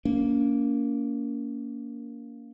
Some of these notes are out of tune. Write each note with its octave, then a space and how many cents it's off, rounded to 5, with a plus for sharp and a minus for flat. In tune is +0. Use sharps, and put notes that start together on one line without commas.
A#3 +0 C#4 +35